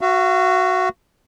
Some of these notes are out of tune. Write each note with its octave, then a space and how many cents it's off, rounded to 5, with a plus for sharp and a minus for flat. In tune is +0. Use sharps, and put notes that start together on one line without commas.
F#4 +0 F5 -45